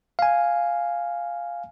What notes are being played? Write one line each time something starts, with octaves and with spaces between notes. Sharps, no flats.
F5 G#5